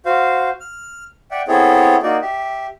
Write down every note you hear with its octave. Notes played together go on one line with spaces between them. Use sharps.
F#4 C5 F5
F6
D5 E5 F#5 G5
B3 C4 E4 G#4 A4 C#5
A#3 D#4 F#4 D5
G4 E5